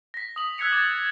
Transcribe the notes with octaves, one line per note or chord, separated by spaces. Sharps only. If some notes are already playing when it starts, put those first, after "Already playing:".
A#6 B6
D#6 F#7
E6 F#6 G#6 B6 C#7 F7
D6 G#6 A6